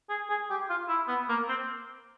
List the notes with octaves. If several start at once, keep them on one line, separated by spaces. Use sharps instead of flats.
G#4
G#4
G4
F4
E4
B3
A#3
C4